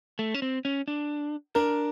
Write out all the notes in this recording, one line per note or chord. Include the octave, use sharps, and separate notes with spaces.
A3
C#4
C4
C#4
D4
D4 A#4